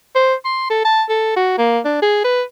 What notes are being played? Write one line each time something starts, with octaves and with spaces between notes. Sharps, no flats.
C5
C6
A4
A5
A4
F#4
A#3
D4
G#4
B4